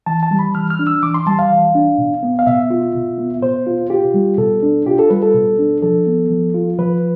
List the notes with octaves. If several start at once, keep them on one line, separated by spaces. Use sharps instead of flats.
E3 A5
A5
G3
B5
E3 F6
F6
D4
E6
E3 D6
C6
G3 A5
F5
E3
D4
B2
B3
F5
B2 E5
F4
B2
B3
B2 C5
F4
F4 G4
G3
B2 A4
D4
F4 G4
A4
G3 B4
A4
B2
D4
F3 A4
B3
F3
F4
F3 B4